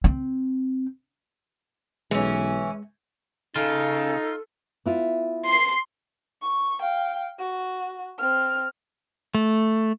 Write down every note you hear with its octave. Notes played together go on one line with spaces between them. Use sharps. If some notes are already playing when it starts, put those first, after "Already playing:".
C4
B1 E3 G#3 C#4
C#3 D#4 F4 A4
B3 E4 F4
C6 C7
C#6
F5 G5
F#4
C4 F6
A3